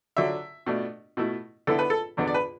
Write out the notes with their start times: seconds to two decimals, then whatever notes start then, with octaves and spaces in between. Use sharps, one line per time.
0.17 D3 F#3 D4 E5
0.66 B2 A3 D4
1.17 B2 A3 E4
1.67 D3 B3 E4 A4
1.79 B4
1.90 A4
2.17 E2 D3 B3 D4
2.27 D5
2.34 B4